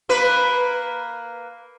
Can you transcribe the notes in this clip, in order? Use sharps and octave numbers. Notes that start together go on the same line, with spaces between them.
A#3 B4